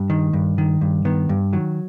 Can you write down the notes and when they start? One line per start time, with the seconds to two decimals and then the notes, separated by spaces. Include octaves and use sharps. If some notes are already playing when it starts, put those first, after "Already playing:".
Already playing: G2
0.10 D#3
0.33 G2
0.58 D#3
0.81 G2
1.05 D#3 B3
1.29 G2
1.53 D#3 F#3